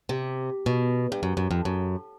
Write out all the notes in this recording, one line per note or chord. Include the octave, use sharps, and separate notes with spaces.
C3
B2
G2
F#2
F#2
F2
F#2